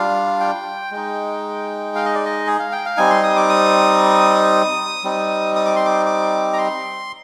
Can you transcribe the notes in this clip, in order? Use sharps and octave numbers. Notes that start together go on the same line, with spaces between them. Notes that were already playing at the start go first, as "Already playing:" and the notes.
Already playing: G3 D4 F4 F5
G5
G#3 D#4
F5
D#5
D5
D#5
G#4
F5
G5
F5
G3 C4 D#4 G#5
C6
D#6
D6
D#6
G3 C4 D#4
D#6
D6
C6
D6
D6
A#5
C6